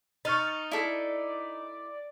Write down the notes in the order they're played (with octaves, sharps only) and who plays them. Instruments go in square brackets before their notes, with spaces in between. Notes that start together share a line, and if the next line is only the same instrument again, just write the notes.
[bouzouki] D#4 [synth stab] C#6 F6 A6
[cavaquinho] E4 A4 [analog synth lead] D5